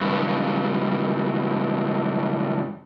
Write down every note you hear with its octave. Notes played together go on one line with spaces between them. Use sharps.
C#2 G2